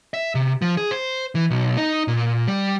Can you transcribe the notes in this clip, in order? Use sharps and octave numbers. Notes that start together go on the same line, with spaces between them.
E5
C3
F3
G#4
C5
E3
B1
D#4
A#2
G3